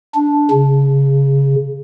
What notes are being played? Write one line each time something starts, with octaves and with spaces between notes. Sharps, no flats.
D4
C#3